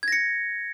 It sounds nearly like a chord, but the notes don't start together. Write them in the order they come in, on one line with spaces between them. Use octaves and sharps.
G#6 A#6 C#7